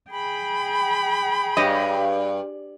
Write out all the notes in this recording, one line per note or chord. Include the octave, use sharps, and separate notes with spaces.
G#4 G5 B5
G2 G4 C#5 D#5